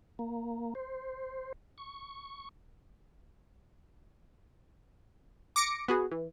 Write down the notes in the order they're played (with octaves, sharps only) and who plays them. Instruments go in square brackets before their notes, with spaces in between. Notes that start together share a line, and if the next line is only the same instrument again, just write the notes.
[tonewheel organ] A#3
C5
C#6
[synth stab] D6 A#6 C#7 D7
B3 F#4 G#4
E3